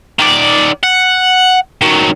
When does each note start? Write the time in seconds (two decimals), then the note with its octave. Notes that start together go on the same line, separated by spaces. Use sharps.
0.19 D#3 D5
0.83 F#5
1.81 D#3 F#3